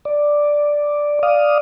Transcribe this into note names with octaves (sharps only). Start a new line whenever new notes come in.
D5
D5 F5 D#6